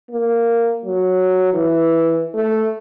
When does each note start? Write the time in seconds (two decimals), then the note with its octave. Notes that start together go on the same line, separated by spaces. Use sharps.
0.10 A#3
0.85 F#3
1.54 E3
2.34 A3